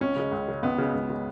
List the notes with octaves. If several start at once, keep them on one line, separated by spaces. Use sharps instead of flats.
C#2 C#4
C#3 G#3
C#2
C#3 G#3
C#2 B3
C#3 G#3
C#2
C#3 G#3